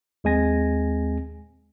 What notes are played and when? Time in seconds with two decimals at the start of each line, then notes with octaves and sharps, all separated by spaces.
0.24 D#2 G#3 C4 G#5 A#6